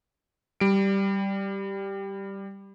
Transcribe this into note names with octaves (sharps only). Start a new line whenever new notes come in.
G3 D7